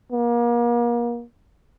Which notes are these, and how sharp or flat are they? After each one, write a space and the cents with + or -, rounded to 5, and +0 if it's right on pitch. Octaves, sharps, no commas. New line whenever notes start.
A#3 +35